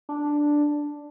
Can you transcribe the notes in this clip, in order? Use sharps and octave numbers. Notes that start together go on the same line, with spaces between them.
D4